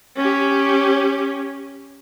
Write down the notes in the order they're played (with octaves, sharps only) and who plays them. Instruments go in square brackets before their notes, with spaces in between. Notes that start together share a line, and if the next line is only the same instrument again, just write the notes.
[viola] C#4 G4